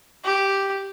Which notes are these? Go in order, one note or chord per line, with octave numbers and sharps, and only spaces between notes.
G4